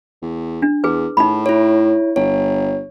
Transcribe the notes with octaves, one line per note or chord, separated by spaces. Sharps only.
E2
D4
E2 G#4 B4
A2 D#4 B5
E4 C#5
G1 C#5